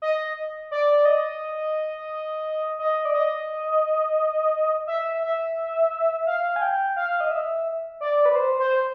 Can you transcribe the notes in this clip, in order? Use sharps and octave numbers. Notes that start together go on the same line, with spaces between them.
D#5
D5
D#5
D#5
D5
D#5
E5
E5
F5
G#5
G5
F5
D#5
E5
D5
B4
C5
C5